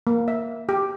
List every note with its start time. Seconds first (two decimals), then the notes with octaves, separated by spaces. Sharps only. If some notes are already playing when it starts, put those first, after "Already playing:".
0.07 A#3
0.28 E5
0.69 G4